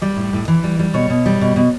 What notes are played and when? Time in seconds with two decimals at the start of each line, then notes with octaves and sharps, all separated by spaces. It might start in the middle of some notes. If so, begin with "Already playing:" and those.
0.02 G3 D5
0.17 A2
0.33 A2
0.48 E3
0.64 G3
0.79 G3
0.94 B2 C#5
1.10 B2
1.26 G3
1.41 B2
1.56 B2